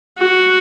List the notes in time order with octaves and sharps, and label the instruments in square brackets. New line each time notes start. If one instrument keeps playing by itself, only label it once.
[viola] F#4